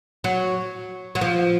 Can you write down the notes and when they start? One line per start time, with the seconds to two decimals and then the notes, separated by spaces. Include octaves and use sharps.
0.24 F#3
1.15 F#3
1.21 F3